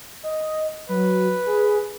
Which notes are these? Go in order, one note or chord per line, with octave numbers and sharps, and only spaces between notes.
D#5
F#3 B4
G#4